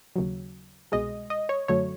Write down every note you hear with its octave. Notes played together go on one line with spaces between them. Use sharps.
D#2 C#3 F#3
C2 B2 G#3 D#5
D#5
C#5
F#2 D3 F#3 A3 C#5